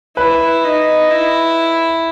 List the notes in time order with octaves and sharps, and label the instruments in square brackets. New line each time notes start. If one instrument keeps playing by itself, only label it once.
[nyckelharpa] E4 [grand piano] B4
[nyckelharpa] D#4
E4